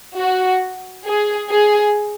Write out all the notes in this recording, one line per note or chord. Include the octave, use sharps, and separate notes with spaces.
F#4
G#4
G#4